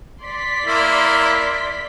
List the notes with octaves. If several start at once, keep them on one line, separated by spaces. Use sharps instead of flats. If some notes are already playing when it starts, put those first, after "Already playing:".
D5 C6 B6
A#3 E4